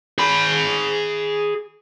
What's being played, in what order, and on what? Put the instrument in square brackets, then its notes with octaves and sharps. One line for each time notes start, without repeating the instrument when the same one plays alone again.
[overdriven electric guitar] G#4 B5